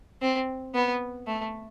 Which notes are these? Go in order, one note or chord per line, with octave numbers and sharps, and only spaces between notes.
C4
B3
A3